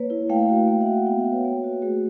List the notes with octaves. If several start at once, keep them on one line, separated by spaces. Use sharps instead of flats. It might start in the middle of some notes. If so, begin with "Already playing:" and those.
Already playing: A#3 B4 C#5
E4
A3 F5 G5
F#4
A#3 F5 G5
E5 F#5
F#4
E5 F#5
B3 F5 G5
E5 F#5
F#4
B4 C#5
A#3
F#4
A3 F#4 G#4